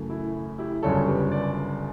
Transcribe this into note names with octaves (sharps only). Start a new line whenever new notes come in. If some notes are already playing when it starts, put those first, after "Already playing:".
Already playing: F#2 C#3 E3 A3
E4
E4 G4
G1 F#2 C#3 G3 A4 C#5
G4 B4
B4 D5